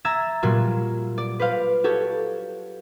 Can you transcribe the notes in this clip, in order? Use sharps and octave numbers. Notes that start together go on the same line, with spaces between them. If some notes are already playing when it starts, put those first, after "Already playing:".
E5 A#5 E6 G#6 A6 E7
A#2 F#3 G3 F4 F#4
D5
B4 C5 F5
F#4 G4 A4 C#5